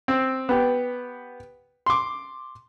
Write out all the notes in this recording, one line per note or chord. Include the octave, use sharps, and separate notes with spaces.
C4
B3 G4
C6 D6